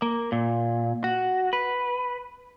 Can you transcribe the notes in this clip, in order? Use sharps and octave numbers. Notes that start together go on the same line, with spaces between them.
A#3
A#2
F#4
B4